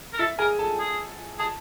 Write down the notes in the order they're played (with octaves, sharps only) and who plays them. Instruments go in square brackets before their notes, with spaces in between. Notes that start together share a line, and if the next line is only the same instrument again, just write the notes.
[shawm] A#4
[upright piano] E4 E5 [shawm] A4
[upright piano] G#4 G#5 [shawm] A#4
[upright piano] A4 A5
[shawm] G#4
[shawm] G#4 [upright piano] A5